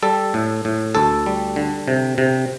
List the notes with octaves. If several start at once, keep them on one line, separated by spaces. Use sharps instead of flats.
G3 A4
A2
A2
D2 A4
G3
D3
C3
C3